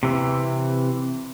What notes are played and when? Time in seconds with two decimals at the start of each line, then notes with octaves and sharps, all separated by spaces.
0.03 C3 E3